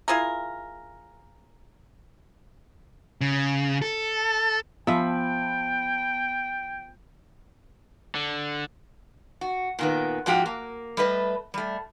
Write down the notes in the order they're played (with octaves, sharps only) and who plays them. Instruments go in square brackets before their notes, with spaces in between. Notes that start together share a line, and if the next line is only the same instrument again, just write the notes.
[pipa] E4 F4 G#4 A#4
[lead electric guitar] C#3
A4
[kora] F3 E5 [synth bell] B3 A5 B5 [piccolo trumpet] G5
[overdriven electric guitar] D3
[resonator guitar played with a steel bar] F#4
A#2 D#3 B3
G#2 F3 F#4 G4
A#3
G3 A3 B4 D#5
G3 A3